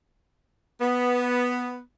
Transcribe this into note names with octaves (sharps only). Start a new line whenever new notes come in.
B3